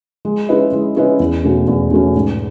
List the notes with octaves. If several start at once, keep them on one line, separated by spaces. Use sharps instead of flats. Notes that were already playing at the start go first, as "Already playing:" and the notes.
G#3
C#4 E4 B4 D#5
G#3
C#4 E4 B4 D#5
E2
B2 A3 C#4
E2
B2 A3 C#4
G#2